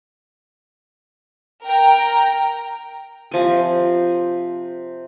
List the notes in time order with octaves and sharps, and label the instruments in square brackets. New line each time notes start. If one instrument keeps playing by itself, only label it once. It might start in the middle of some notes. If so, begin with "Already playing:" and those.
[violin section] A#4 G5 A#5
[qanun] C3 F3 G#5